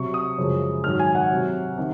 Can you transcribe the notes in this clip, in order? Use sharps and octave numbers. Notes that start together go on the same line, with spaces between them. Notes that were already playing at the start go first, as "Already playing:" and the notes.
Already playing: C3 F#3 C#6
D#6
F#2 C#3 F3 G#3
G#2 D#3 F#3 F6
G#5
F#5
C3 F#3
C3 D#3